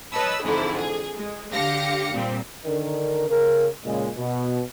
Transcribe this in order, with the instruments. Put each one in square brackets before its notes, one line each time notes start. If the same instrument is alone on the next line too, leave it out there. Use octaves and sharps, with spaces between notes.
[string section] B4 C#5 D#5 A5 B5 E6
F2 G#2 D3 E3 E4
G#4
G#3
D3 G4 F5 A#6 C#7
A#2 G3 C4
[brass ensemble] D3 D#3 D4 A#4
C#3 A#4
A#2 C#3 G#3
B2